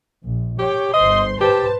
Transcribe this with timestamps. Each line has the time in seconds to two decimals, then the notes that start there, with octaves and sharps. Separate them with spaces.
0.23 A#1
0.59 G4 C#5 G5
0.94 G1 C5 D#5 C6
1.41 G4 B4 C5 A5